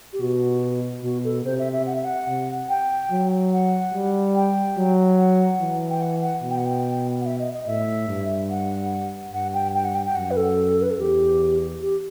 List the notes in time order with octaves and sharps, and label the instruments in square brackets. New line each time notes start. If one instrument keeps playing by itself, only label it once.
[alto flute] G4
[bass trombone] B2 [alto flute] F#4
[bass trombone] B2 [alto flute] F#4
[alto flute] A4
[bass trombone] C3 [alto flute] C5
[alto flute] E5
E5
F#5
E5
F#5
[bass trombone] C3
[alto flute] G5
[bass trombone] F#3
[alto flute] F#5
[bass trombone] G3
[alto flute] G5
[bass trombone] F#3
[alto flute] F#5
[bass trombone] E3
[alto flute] G5
F#5
F#5
[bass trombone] B2
[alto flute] G5
F#5
G5
F#5
E5
D#5
D#5
[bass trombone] A2 [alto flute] E5
[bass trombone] G2
[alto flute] F#5
[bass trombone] G2 [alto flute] F#5
[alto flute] G5
G5
F#5
G5
G5
[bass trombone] F#2 [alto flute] F#5
[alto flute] B4
A4
B4
A4
[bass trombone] E2 [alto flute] G4
[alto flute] G4